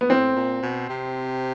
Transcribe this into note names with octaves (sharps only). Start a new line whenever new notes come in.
B3
A2 C4
A#2
B2
C3